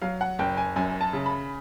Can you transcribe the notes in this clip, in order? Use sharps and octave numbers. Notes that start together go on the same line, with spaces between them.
F#3 F5
F#5
F#1 G5
G#5
F#2 G#5
A5
C#3
B5